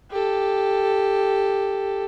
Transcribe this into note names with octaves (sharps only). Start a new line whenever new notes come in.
G4 A4